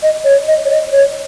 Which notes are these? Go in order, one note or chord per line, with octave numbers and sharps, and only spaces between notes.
D#5
C#5
D#5
C#5
D#5
C#5